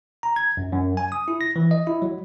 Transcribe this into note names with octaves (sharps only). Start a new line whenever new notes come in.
A#5
G#6
F#2
F#2
G#5
D#6
E4
A#6
E3
D#5
E4
F#3